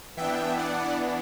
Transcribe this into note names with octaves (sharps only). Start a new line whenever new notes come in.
E3 B3 D4 E5 G5
D5 F#5